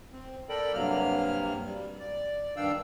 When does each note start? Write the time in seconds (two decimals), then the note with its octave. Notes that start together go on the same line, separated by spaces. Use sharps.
0.12 C4
0.49 A4 A#4 D5 G5 B5
0.74 G2 C3 F#3 A#3 F6
1.64 G3
1.99 D5
2.56 G2 D#3 D4 F5 G5 E6